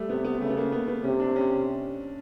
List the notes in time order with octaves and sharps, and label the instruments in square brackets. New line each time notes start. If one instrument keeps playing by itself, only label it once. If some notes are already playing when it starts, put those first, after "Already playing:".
Already playing: [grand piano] G3 A3
[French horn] C3 [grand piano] B3
[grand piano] B3
[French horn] C#3 [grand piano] A3
[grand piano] B3
A#3
B3
B3
[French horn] C3 [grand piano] C#4
[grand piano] D4
C#4
C#4